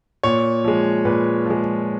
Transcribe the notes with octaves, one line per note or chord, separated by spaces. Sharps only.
A#2 C#5
F3 G#3
A#2 B4
F3 G#3